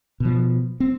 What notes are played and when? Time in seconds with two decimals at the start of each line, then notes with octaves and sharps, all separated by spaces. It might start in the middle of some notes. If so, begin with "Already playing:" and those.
0.20 B2 F3
0.80 C4